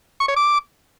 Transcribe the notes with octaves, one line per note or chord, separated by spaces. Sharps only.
C#6
C#5
D6